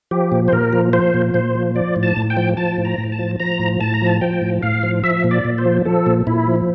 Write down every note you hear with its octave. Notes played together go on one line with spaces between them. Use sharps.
F3 G4
A#2
C5
A#2 A#4
F3
F3 C5
A#2
A#2 C5
F3
F3 D5
A2
A5
A2
G5
F3
F3 A5
A2
A#5
A2
A5
F3
F3 A#5
A2
A2 A5
A#5
F3
A5
F3 G5
A2
A2 F5
F3
F3 E5
A#2
D5
A#2
C5
F3
F3 A4
A#2
A#2 E4
F3